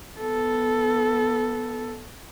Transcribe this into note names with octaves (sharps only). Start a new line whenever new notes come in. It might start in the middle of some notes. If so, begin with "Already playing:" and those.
B3 A4